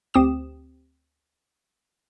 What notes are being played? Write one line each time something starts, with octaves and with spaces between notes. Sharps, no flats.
D2 C4 G4 D#6 E7